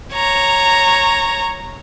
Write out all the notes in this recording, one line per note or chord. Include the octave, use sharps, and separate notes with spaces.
C#5 A#5